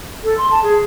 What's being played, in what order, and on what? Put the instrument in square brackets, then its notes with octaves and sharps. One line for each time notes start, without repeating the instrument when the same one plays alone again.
[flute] A4
C6
A5
G#4